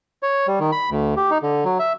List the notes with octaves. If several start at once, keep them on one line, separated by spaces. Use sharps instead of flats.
C#5
G3
D#3
B5
D2
G4
D#4
D3
F#3
E5